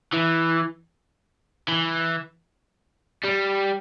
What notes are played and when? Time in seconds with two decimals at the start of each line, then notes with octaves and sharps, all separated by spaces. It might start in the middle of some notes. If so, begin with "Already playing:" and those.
0.13 E3
1.68 E3
3.24 G3